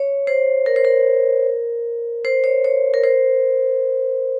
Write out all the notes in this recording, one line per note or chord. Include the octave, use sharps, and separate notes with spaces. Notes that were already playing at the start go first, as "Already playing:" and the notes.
Already playing: C#5
C5
A#4
C5
A#4
C5
C#5
C#5
A#4
C5